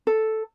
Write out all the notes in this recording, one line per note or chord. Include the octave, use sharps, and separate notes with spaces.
A4